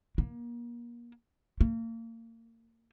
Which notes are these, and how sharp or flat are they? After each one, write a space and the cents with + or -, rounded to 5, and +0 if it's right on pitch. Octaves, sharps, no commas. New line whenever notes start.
A#3 +30
A#3 -35